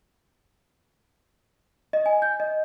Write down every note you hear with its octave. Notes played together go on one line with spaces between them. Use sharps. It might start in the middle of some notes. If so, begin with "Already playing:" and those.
D#5
G#5
G6
D#5